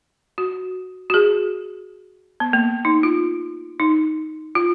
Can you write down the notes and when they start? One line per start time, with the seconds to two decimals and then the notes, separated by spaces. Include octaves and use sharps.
0.38 F#4
1.10 F#4
1.14 G#4
2.40 B3
2.53 A#3
2.85 D#4
3.03 F4
3.80 D#4
4.55 F4